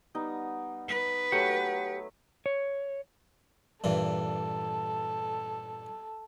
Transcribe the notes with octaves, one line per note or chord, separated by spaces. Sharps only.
G3 B3 D#4
B4
F#3 A3 G4 F#5
C#5
G2 A#2 E3 A4